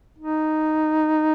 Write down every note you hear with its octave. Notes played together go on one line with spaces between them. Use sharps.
D#4